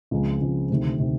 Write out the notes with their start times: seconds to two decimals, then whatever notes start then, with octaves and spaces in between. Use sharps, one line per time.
0.11 C#2 C#3 F3 G#3 C4
0.41 C#2 C#3 F3 G#3 C4
0.70 D2 C3 D#3
0.99 C3 D#3